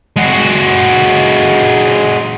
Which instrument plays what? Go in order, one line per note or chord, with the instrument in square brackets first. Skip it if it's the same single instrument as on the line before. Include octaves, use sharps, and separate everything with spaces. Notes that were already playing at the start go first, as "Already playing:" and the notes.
[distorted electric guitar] G#3 F#4